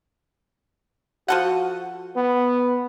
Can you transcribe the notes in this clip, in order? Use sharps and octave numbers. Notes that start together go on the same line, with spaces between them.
F3 F#4 A4 F#5
B3